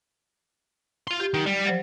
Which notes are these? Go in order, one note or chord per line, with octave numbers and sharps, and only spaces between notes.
F5 C6
G4
D#3 F#3
G3
F3 F#3 C5